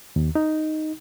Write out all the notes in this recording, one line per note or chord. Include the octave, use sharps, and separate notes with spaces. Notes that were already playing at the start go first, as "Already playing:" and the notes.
D#2
D#4